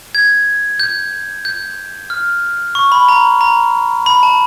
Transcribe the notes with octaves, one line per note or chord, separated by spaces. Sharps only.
G#6
G6
G6
F6
C#6
B5
A#5
A#5
B5
A5